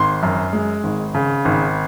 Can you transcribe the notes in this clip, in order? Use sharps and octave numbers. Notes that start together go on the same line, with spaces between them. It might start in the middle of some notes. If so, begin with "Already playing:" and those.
Already playing: G#1 C6
F#2
G#3
G#1
C#3
G#1